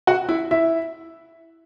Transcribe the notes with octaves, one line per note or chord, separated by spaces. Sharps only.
F#4 F#5
E4 E5
E4 E5